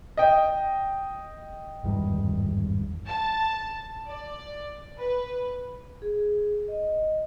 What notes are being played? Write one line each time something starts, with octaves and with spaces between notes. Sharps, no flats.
D#5 G5
G#1 E2 G2
A5
D5
B4
G#4
D#5